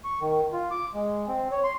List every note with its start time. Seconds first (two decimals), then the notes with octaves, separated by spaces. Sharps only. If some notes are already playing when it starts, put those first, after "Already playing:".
0.04 C#6
0.21 D#3
0.53 F4
0.71 D6
0.94 G#3
1.28 C4
1.51 C#5
1.64 C6